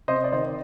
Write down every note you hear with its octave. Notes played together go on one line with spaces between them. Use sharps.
C3 C5 D#5
D5
D#3 C5 D#5